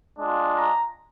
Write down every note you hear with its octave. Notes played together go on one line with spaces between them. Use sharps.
G#3 D4 F4
A#5